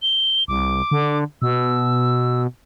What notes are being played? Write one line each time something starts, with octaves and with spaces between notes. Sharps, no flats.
G7
C2 D6
D3
B2 E6